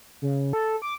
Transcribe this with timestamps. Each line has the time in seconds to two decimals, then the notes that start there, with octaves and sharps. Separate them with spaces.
0.22 C#3
0.53 A4
0.82 D6